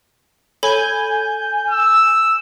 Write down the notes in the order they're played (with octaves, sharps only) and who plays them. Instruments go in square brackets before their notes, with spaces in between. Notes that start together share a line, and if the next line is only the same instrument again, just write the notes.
[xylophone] A4 C#5 B5 [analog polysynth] G#5 G6
[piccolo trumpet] E6